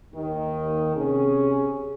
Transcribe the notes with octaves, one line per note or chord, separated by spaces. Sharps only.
D#2 D#3
C3 C#4 G#4